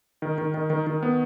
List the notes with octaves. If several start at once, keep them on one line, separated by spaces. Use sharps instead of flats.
D#3
D#3
D#3
D#3
D#3
B3